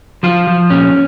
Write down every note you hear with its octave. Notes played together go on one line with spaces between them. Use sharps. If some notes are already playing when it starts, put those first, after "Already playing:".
F3 F4
F3
A#2 C#4